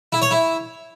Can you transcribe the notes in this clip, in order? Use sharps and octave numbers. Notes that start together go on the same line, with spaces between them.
E4
C#5
E4